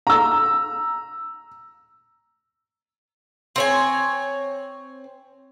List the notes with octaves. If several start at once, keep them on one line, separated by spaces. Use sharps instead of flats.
A#5 E6
C4 C#5 G#5